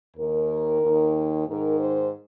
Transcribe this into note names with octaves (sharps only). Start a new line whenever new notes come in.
D#2 D#3 A#4
D#2 D#3
G#2 D#3 A#4
C5